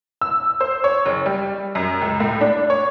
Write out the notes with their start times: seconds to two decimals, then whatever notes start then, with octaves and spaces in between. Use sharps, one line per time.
0.21 E6
0.61 C5
0.84 C#5
1.06 F#1
1.26 G3
1.75 F#2
2.01 C#2
2.20 A2
2.41 D4
2.70 C#5